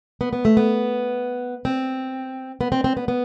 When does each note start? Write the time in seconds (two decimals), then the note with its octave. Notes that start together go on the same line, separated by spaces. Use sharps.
0.21 B3
0.33 B3
0.45 A3
0.57 B3
1.65 C4
2.61 B3
2.72 C4
2.84 C4
2.97 B3
3.08 B3